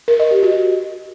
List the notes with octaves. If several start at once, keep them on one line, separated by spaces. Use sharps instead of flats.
A#4
D#5
G4
F#4